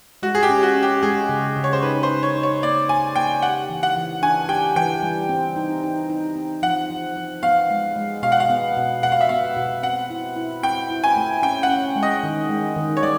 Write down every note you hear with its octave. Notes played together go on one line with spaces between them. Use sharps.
G#3 F#4
G#4
G4
C#4
F#4
C#4
G4
G#3 G#4
C#3
C#3
C#5
C5
D#4 B4
C5
D#4
C#5
D#4
C#5
A#3 D5
A#3 G#5
A#3 G5
G4 F#5
E3
F#5
E3
D4 G#5
G4 G5
E3 G5
G3
C4
D#4
D#4
D#4
C4
F3 F#5
F3
F3
B3 F5
G#3
G#3
B2 F5
F#5
F5
B3
B2
B2 F#5
F5
E5
B3 F5
B2
C4 F#5
E4
E4
C4 G5
E4
G#5
A3
C#4 G5
F#5
C#4
G#3
D#5
D#3
G#3
D#3
C#5
G3 D5